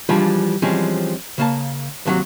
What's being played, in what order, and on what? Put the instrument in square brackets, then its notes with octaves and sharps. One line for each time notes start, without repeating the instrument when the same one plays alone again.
[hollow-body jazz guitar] E3 F3 G3 G#3 D4 F4
E3 F3 G3 G#3 C4 C#4
C#3 A#3 A5
D#2 C3 E3 F#3